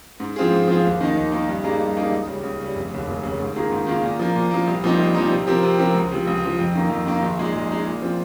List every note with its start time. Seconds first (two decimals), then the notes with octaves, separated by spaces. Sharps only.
0.20 G#2
0.36 F3 C4 F4 G#4
0.52 G#2
0.68 F3 C4 F4 G#4
0.85 D#2
1.01 D#3 A#3 D#4
1.15 D#2
1.32 D#3 A#3 D#4
1.48 G2
1.64 G3 A#3 D#4 G#4
1.80 G2
1.96 G3 A#3 D#4 G#4
2.12 C#2
2.27 C#3 G3
2.43 C#2
2.60 C#3 G3
2.75 F1
2.92 D#2 C#3
3.07 F1
3.23 D#2 C#3
3.40 G#2
3.56 D#3 A#3 F4 G#4
3.71 G#2
3.87 D#3 A#3 F4 G#4
4.03 A#2
4.20 F3 A#3
4.36 A#2
4.51 F3 A#3
4.67 C2
4.84 A#2 F3 C4 D#4
4.99 C2
5.15 A#2 F3 C4 D#4
5.30 C3
5.47 F3 C4 G4 A#4
5.63 C3
5.78 F3 C4 G4 A#4
5.95 C#2
6.11 C3 F3
6.27 C#2
6.42 C3 F3
6.59 F2
6.75 D#3 A#3
6.90 F2
7.06 D#3 A#3
7.22 A#1
7.39 A#2 G#3 D#4 G#4
7.55 A#1
7.71 A#2 G#3 D#4 G#4
7.87 A#2
8.02 F3 C4